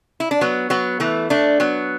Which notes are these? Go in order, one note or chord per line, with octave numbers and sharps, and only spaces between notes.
E4
D4
F#3 B3
F#3 B3
E3 A3
A3 D4
F#3 B3